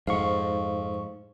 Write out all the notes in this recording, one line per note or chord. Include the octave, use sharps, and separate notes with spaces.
F2 G#2 F5 C#6